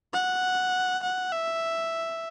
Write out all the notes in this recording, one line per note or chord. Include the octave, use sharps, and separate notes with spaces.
F#5
F#5
E5